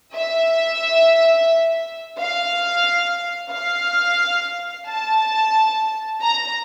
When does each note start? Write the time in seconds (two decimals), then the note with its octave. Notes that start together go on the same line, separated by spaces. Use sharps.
0.15 E5
2.18 F5
3.52 F5
4.87 A5
6.22 A#5